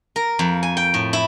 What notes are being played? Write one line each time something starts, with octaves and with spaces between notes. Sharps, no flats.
A#4
F2
G#5
G5
A2
E4